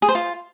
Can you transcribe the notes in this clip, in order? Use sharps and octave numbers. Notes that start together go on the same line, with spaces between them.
G#4
C5
F4